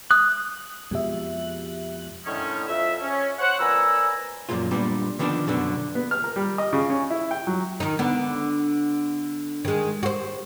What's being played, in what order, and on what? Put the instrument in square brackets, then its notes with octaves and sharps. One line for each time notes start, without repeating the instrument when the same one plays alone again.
[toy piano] D#6 [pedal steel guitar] F#6
[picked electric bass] F2 B2 F3 [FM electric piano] G#3 G4 E5
[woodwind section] A2 D3 D#3 C#4
F2 E5
C#4
C5 C#5 F#5
F2 A#2 B4 G#5 A#5 E6
[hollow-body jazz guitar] F#2 A#2 F3 A#3 F4
A#2 G3 B3 D4
D3 D#3 F3 B3 C#4 D4
F#2 B2 D3 B3
[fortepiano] B3
F6
A#4
G3
D#5
C#3
C#4
E4
G5
F#3
[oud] D#3 D#4
D3 B3
D#3 G#3
F#4 C5